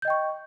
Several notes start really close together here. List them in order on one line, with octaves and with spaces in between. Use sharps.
G6 D#5 G5 C#6